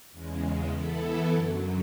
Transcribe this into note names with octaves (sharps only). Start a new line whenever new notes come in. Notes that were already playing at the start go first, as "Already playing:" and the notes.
E2 C#3 G#3
E3 B3 E4 A4
F#2 D3 F#3